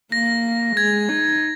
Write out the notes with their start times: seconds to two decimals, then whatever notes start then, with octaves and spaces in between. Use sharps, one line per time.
0.12 A#3 A#6
0.77 G#3 G#6
1.08 D#4